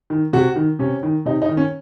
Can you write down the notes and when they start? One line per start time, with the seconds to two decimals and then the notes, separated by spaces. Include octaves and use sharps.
0.10 D#3
0.33 C3 F#4
0.56 D#3
0.79 C3 C#4
1.03 D#3
1.25 C3 D#4
1.42 D#4
1.49 D#3
1.57 C#4